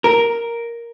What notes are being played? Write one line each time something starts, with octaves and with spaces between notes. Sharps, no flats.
A#4